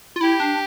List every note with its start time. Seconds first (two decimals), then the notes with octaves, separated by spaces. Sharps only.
0.16 F4
0.21 E4 G4
0.40 D4